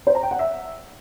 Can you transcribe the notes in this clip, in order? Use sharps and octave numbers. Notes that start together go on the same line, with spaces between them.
C5
A#5
G5
F#5
E5